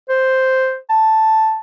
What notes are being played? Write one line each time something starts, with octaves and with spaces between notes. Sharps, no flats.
C5
A5